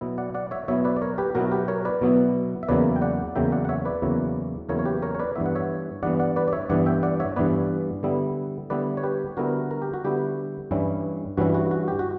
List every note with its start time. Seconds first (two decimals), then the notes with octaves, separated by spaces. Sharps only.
0.01 B2 F#3 B3 E4
0.18 D5 F#5
0.35 D5 F#5
0.51 C#5 E5
0.68 B2 F#3 B3 E4 C#5 E5
0.85 B4 D5
0.96 D5
1.02 A#4 C#5
1.18 G4 B4
1.35 B2 F#3 B3 E4 F#4 A#4
1.51 G4 B4
1.68 A#4 C#5
1.85 B4 D5
2.01 B2 F#3 B3 E4
2.63 E5
2.68 E2 C#3 F#3 A#3 E4 B4 D5
2.96 G5
3.02 D5 F#5
3.35 E2 C#3 F#3 A#3 E4 E5 G5
3.52 D5 F#5
3.65 F#5
3.69 C#5 E5
3.85 B4 D5
4.02 E2 C#3 F#3 A#3 E4
4.69 E2 C#3 F#3 A#3 E4 A#4 C#5
4.79 C#5
4.85 G4 B4
5.02 A#4 C#5
5.15 C#5
5.20 B4 D5
5.36 G2 E3 B3 E5
5.46 F#5
5.55 C#5 E5
6.03 G2 E3 B3 D5 F#5
6.20 D5 F#5
6.36 B4 D5
6.48 D5
6.53 C#5 E5
6.69 G2 E3 B3 D5 F#5
6.86 E5 G5
7.03 D5 F#5
7.20 C#5 E5
7.36 G2 E3 B3 B4 D5
8.03 D3 G3 B3 E4
8.70 D3 G3 B3 E4 B4 D5
8.97 C#5
9.03 G4 B4
9.37 D3 G3 B3 E4 F#4 A#4
9.71 A#4
9.82 G4
9.94 F#4
10.04 D3 G3 B3 E4 G4
10.71 G2 E3 G3 C#4 E4
11.37 G2 E3 G3 C#4 E4 F#4
11.54 F#4
11.71 F#4
11.88 G4
11.99 F#4